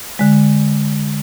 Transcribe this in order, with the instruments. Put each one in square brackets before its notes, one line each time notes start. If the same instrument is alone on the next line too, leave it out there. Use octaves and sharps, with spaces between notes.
[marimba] D3 G#3